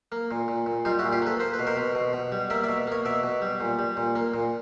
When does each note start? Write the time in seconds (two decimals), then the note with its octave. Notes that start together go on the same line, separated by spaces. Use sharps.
0.12 A#3
0.31 A#2
0.48 A#2
0.66 A#2
0.85 G3 D#4 F4
0.99 E4 F#4
1.03 A#2
1.13 F4 G4
1.22 A#3 A4 B4
1.40 A#3 C5
1.54 B4
1.59 B2
1.67 A#4 C5
1.76 B2
1.95 B2
2.13 B2
2.32 G3
2.50 A#3 D5 E5
2.64 D5 E5
2.69 B2
2.87 A#3 C#5 D#5
3.05 B2 D5 E5
3.23 B2
3.42 G3
3.60 A#2
3.79 G3
3.97 A#2
4.15 A#3
4.34 A#2